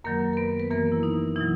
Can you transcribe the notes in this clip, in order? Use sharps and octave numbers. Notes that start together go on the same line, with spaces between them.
F#2 D#3 F#3 A#3 A#4
A#4
B3 B4
B4
F#2 E3 A#3 A#4
E4
D#4
B2 E3 F#3 E4